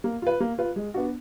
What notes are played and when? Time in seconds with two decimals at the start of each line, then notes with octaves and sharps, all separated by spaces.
0.04 A#3
0.22 F4 B4
0.40 A#3
0.58 F4 B4
0.76 G#3
0.94 B3 D4 F#4